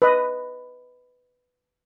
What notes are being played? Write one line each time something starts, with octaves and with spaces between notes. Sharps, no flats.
B4 D#5